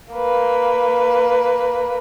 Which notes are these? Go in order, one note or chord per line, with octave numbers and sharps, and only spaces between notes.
A#3 B4